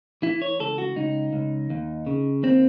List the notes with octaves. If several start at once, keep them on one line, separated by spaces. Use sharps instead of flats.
E3 E4
C#5
C#2 A4
F#4
C#2 D#4
C#2
D#2
C#3
D#2 C4